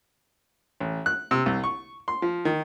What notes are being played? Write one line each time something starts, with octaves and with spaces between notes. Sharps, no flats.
A1
F#6
C3
C2
C#6
C6
F3
D#3